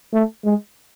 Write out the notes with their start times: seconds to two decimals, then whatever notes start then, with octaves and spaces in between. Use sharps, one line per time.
0.13 A3
0.45 G#3